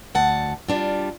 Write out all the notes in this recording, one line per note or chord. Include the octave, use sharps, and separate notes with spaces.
D2 F#5 A5
G3 D4 F4